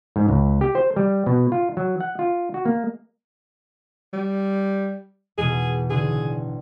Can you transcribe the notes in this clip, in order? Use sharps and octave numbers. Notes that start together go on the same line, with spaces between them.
G#2
C#2
G4
C5
G3
B2
F4
F#3
F#5
F4
F#4
A#3
G3
E2 B2 G#4
A1 D3 G#4